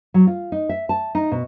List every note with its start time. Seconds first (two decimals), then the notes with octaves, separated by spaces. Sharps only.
0.14 F#3
0.27 F4
0.52 D#4
0.69 E5
0.89 A5
1.15 D#4
1.32 B2